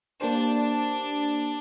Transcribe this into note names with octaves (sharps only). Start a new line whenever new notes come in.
A#3 D4 G4 C5